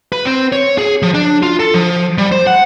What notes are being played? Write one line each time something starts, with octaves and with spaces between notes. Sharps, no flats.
B4
C4
C#5
G#4
F3
D4
F4
A4
F3
G3
C5
F#5